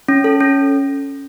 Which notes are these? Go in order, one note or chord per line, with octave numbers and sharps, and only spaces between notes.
C#4
A4
C#4